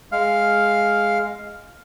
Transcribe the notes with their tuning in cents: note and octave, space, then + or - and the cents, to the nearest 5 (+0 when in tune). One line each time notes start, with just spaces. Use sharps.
G#3 +0 F5 +0